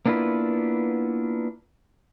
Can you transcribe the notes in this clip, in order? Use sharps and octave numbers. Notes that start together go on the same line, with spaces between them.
A#3 B3 D4 E4 F4 B4